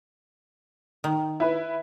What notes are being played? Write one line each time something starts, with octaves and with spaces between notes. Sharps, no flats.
D#3
E4 B4